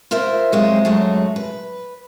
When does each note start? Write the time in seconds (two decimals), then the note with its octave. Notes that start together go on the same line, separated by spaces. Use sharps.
0.11 F4 A#4 C5 E5
0.52 F#3 G#3 C4 F4
0.85 F#2 F#3 G#3 A3
1.36 B4